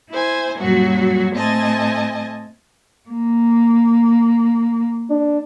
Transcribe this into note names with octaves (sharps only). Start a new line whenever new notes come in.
E4 C5 G#5
F#2 A#2 F#3 G3 F#4
A2 A3 C4 D#5 G#5 A5
A#3
D4